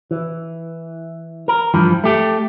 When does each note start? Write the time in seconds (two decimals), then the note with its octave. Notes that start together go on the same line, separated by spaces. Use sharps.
0.11 E3
1.48 A#4
1.74 G2 E3 F3
2.04 A3 G4